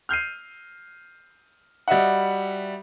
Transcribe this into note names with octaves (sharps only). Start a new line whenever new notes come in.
F6 G6 C7 D#7
G3 F#4 D#5 E5 F#5